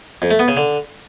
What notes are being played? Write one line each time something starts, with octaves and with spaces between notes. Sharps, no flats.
F2
A3
B3
C#3
D3